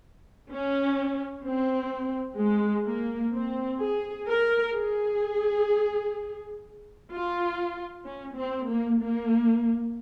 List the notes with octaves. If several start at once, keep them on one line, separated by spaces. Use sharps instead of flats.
C#4
C4
G#3
A#3
C4
G#4
A#4
G#4
F4
C#4
C4
A#3
A#3